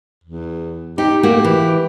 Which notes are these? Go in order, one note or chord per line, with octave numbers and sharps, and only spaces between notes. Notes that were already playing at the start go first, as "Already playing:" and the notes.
E2
D#4 G4
A3 A#3 F#4 G4
E3